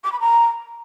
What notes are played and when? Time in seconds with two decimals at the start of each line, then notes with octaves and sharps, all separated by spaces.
0.04 D6
0.12 B5
0.20 A#5